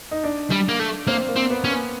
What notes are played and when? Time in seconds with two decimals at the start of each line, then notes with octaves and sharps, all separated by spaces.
0.11 D#4
0.24 D4
0.51 G3
0.69 A#3
0.80 A3
1.07 A#3 C4
1.28 A#3
1.36 C4
1.50 B3
1.64 C#4
1.71 B3